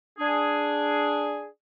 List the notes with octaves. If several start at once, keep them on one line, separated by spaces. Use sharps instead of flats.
D4 G#4